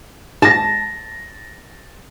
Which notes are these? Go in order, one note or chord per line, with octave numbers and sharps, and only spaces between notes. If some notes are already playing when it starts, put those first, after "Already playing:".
G#2 A5 A6 A#6